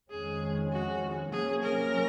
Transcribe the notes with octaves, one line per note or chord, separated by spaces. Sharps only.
F2 D#3 G#3 C#4 G#4
F#4
C3 F#3 A#3 C#4 G#4
A#4